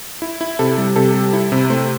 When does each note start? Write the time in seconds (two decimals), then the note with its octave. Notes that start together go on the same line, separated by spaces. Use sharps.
0.22 E4
0.41 E4
0.59 C3 A4
0.78 G3
0.96 C3 A4
1.14 G3
1.33 E4
1.52 C3
1.70 A3 C5